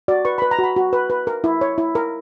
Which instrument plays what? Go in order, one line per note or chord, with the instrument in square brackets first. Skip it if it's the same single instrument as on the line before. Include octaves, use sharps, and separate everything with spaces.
[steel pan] F#4 D5
B4 C#6
B4 B5
A#5
F#4
B5
F#4
B4
B4
A#4
E4
C#5
E4
A#4